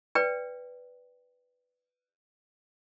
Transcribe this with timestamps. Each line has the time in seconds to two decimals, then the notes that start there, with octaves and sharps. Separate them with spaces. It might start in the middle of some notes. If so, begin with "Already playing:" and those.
0.15 B4 D5 G5